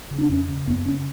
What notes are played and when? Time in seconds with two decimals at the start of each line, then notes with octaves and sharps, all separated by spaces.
0.11 C#3
0.18 D4
0.29 F2 C#4
0.48 C#3
0.67 F#2 B3
0.86 C#3 C#4